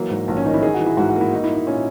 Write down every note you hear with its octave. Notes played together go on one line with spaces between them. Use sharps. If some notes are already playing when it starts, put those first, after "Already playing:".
Already playing: E3 F#3 A#3
G#2
A#1
C#4
D#3 D#4
E4
D#4 G#4
F#4
E3
E4
G#2 F#4
F#4
A#3
E4
D#4 F#4
E4
A#3
D#4
A#2 C#4